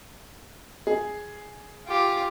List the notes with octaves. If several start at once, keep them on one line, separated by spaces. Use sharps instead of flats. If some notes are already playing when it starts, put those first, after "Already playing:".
G#4
F4 G4